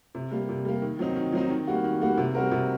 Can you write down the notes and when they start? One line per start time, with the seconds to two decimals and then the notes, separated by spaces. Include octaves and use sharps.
0.15 C3
0.31 G3 A#3
0.49 C3
0.65 G3 A#3
0.82 D#3
0.99 F#3 C4 D#4
1.16 D#3
1.33 F#3 C4 D#4
1.50 D#3
1.67 G3 A#3 F#4
1.84 D#3
2.01 G3 A#3 F#4
2.17 C3
2.35 G3 C4 F#4 A#4
2.51 C3